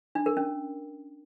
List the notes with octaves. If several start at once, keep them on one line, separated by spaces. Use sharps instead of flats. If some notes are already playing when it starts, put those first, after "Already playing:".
D4
A#4
C#4